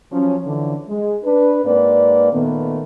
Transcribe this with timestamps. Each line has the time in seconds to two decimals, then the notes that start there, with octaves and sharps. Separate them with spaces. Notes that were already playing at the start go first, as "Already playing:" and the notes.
0.11 F3 F#3 C#4
0.44 D3 E3 F3 C#4
0.88 G#3
1.23 D4 B4
1.64 G#2 A#3 C4 B4 D5
2.31 A#2 D#3 A3 B3